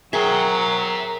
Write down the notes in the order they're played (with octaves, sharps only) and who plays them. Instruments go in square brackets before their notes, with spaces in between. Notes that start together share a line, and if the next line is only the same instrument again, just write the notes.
[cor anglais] F#3 [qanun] G#4 [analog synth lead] A#4 [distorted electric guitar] E5 G5